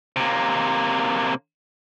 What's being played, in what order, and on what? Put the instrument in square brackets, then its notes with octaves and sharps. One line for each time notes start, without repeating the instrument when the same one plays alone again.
[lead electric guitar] C3 A#3